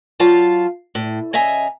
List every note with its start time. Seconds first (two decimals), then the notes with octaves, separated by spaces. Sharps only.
0.20 F#3 F4 F5 A5
0.95 A2
1.33 C#3 D#5 E5 G#5 A#5